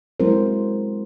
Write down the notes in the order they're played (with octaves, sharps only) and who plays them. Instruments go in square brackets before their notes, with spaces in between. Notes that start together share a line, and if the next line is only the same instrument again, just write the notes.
[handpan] F#3 G#3 C4 E4 A#4 C5